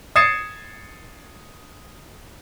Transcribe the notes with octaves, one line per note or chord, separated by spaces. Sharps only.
D#6 G#6 A6 C7 C#7 E7